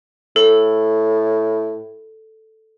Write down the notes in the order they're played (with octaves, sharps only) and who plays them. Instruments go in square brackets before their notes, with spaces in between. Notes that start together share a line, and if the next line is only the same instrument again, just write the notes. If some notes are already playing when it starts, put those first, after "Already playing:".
[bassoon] A2 [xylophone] A4